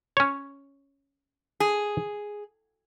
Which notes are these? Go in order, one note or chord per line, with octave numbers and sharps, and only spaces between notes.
C#4 C#5
G#4